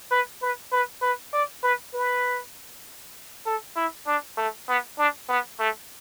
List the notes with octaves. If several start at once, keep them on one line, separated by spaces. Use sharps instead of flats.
B4
B4
B4
B4
D5
B4
B4
A4
E4
D4
A3
B3
D4
B3
A3